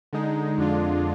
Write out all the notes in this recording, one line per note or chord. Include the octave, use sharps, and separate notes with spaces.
D3 G#3 D#4
F2 D3 G#3 D4 F4